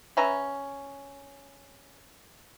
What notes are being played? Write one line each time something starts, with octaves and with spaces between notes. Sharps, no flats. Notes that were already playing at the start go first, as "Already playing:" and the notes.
C#4 B4 E5 A#5